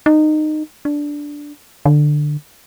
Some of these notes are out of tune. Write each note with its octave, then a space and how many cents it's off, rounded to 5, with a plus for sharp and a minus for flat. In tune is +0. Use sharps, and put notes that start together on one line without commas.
D#4 -20
D4 -5
D3 +15